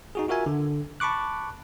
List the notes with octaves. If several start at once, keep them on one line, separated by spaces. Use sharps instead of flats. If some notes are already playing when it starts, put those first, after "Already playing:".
D#4 F#4 G#4
F4 F#4 A#4 E5 G#5
D3
A5 B5 C#6 D6 F#6